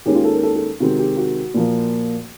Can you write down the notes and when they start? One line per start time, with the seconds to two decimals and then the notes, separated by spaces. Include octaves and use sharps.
0.05 D#2 D#3 G#3 C#4 G4
0.15 F4
0.24 A4
0.33 A#4
0.43 A4
0.55 A4
0.80 C3 D#3 G#3 C4 F#4
0.99 G4
1.17 F#4
1.54 A#2 F3 A#3